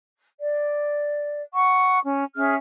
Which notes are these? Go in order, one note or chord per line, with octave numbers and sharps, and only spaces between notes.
D5
F#5 C#6
C#4
C#4 G#4 E5 F6